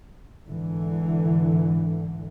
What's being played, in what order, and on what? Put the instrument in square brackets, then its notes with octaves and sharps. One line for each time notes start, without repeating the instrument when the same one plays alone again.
[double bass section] G#2 D3 E3